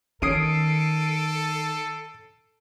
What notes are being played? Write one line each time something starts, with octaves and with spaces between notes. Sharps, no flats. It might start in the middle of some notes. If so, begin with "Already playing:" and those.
D#3 C#4 A4 D#6 C7 D7 D#7